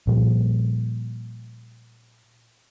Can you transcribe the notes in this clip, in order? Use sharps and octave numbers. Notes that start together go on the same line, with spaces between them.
A#2 F3 G3